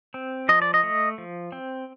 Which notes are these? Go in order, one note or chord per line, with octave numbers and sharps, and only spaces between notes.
C4
F3 D#5
D5
D#5
A3
F3
C4